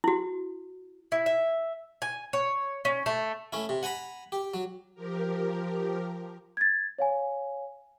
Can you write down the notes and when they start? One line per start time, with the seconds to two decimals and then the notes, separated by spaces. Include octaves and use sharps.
0.04 E4 F#4
1.12 E4
1.26 E5
2.02 G#5
2.33 C#5
2.85 C#4
3.06 A3
3.53 A3 C#4 E4
3.69 C3
3.83 F#5 G#5 A#5 B5
4.32 G4
4.54 F#3
4.95 F3 G4 A#4
6.57 G#6 A6
6.99 C#5 F5 G#5